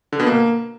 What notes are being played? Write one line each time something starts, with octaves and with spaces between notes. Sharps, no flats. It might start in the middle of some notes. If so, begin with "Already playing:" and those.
D3
B2
A#3